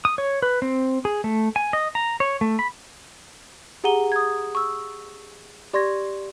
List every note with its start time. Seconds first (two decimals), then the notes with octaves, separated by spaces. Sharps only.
0.05 D#6
0.18 C#5
0.42 B4
0.62 C4
1.05 G#4
1.24 A3
1.56 G#5
1.73 D#5
1.95 A#5
2.20 C#5
2.41 A3
2.59 B5
3.84 G4 G#4 F#5 A#5 D#7 G7
4.12 D#6 G#6
4.55 C#6 E6
5.74 G4 D5 C6 C#6 G#6 A#6